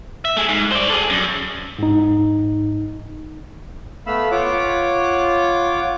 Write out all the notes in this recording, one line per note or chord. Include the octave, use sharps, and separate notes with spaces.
E5
A3 G#4
G#2
C5 D5
G#4 A4
F#2
G#2 D#4
A3 B3 F5 B5 E6
F4 C#5 F#5 D6